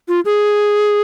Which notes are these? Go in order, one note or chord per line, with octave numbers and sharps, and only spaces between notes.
F4
G#4